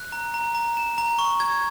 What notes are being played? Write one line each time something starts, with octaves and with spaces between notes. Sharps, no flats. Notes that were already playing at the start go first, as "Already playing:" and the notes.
Already playing: F#6
A#5
A#5
A#5
E7
A#5
C#6
G#6